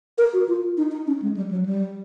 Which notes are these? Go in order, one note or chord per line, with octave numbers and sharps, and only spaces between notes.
A#4
F#4
F4
D#4
D#4
C#4
G#3
G3
F#3
G3